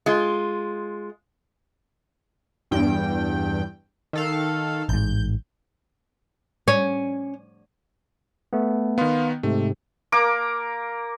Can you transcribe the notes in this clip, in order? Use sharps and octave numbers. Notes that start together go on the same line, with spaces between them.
G#3 F4
E2 G2 G5
D#3 A4 F5
A1 G#2 G6
C#4
A3 B3
D#3 B3 F5 C6
G#2 C3 A3
A#3 A#4 D6